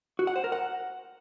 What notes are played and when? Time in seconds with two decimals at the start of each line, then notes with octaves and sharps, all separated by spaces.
0.19 F#4
0.27 F#5
0.36 C5
0.44 A#4
0.52 F#5